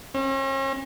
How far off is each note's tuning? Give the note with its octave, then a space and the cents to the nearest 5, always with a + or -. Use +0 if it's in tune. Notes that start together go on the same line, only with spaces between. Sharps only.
C#4 -45